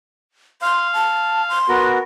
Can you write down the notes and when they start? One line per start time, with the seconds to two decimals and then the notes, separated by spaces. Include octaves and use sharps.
0.62 F5 C6
0.94 A5
1.49 C6
1.69 B3 F#4 A#4